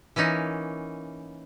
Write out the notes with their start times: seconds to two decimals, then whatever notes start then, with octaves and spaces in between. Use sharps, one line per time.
0.16 E3 A#3 C#4 D#4